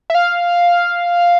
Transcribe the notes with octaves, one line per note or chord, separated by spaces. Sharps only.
E5
F5